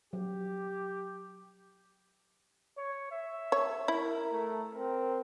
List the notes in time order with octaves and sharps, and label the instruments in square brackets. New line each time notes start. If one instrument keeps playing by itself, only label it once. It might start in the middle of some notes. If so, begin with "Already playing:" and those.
[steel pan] F#3 [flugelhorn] G4
[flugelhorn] C#5
E5
[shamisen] C#5
[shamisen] E4 [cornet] A#4
[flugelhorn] A3
[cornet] C4 [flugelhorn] A#4